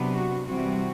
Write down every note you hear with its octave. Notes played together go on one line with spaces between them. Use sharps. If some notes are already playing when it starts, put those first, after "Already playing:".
Already playing: C3 F#3 B3 D4
F#4
C3 E3 G3 C4 F#4